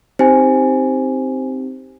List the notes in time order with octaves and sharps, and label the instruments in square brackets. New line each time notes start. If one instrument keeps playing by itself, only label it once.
[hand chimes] C4 D#4 G4 [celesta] C5 G#5